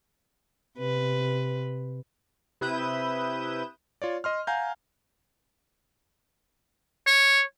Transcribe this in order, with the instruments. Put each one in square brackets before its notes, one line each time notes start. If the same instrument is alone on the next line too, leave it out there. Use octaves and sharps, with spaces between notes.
[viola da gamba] C3 B4
[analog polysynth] C3 E4 B4 D#6 G6 E7
[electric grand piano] F4 C#5 D5
D#5 C6 F6
F5 F#5 G#5 A#5 G6
[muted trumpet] C#5